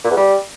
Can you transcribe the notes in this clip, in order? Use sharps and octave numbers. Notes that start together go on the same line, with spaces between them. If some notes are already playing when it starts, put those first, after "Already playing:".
A#2
E2
G3